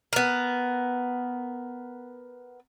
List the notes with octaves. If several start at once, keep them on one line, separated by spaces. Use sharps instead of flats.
B3 A#4